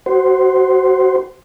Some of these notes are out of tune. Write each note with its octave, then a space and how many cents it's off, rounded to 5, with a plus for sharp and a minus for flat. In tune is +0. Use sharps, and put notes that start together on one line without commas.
F#4 +25 C5 +0